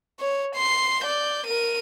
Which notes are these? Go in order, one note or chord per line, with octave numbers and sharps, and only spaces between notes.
C#5
C6 C7
D5 G6
A#4 D#7